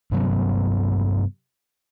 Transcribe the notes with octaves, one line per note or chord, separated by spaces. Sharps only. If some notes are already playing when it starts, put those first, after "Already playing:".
G2 C3 F#3 B3